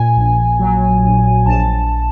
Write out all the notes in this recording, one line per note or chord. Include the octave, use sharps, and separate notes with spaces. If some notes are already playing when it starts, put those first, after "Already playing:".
Already playing: A#2 G#5
A#1
F#3
A#1
A#1 A5